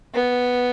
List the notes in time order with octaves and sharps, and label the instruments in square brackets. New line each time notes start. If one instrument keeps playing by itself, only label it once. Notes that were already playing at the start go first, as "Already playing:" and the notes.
[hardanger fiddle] B3